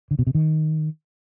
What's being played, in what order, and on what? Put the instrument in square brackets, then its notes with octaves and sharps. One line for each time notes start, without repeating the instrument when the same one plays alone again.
[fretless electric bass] D3
B2
C3
D#3